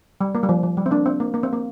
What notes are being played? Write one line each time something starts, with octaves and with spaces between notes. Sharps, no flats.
G3
A#3
G3
F3
F3
G3
C4
A#3 D4
C4
A#3
A#3
C4
A#3